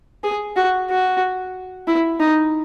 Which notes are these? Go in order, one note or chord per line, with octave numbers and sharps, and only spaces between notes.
G#4
F#4
F#4
E4
D#4